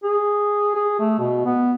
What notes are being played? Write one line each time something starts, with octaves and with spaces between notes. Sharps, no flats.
G#4
G#4
A3
B2
B3